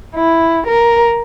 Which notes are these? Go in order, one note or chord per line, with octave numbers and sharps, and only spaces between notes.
E4
A#4